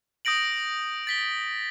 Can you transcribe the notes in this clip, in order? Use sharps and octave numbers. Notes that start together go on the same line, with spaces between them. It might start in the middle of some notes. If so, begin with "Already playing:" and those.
D#6 G6 A#6 D7 F#7
A6 B6 G7